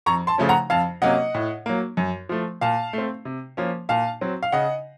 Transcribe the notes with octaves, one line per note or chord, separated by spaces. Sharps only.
F2 A#5 C#6
A5 C6
C#3 F3 A3 C#4
F#5 A#5
F2 F5 A5
C3 F#3 A#3 C#4 D#5 F#5
A2
F#3 A#3
F#2
F3 A3
A#2 F5 A5
A3 C4
C3
F3 A#3 C#4
A#2 F5 A5
F#3 C4
F5
C#3 D#5 F#5